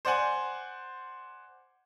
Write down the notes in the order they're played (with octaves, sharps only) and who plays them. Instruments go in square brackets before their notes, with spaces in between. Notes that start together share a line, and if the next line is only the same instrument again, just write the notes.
[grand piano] C5 D5 F#5 G#5